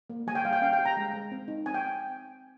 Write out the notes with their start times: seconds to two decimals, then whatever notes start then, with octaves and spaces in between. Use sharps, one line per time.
0.10 A#3
0.27 G3 G#5
0.35 G5
0.45 G3 F5
0.53 G5
0.62 C#4 F5
0.73 G5
0.79 G4
0.85 A#5
0.97 G#3
1.13 G#3
1.31 C4
1.48 D#4
1.66 C4 G#5
1.74 G5